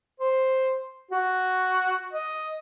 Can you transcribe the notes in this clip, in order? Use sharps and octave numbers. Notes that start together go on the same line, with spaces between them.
C5
F#4
D#5